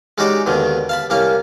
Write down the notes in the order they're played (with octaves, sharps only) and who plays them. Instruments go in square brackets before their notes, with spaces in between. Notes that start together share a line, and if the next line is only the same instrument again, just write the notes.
[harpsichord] G#3 C#4 D#4 F#4 G4 D5
D#2 B2 D3 D#3
F5 A5 B5
C2 A#3 C#4 F5